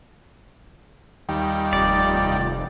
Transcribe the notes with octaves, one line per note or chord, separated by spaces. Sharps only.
D#2 G3
F1 D5